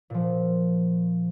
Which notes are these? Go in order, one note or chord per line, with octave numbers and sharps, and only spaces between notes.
A#2 F3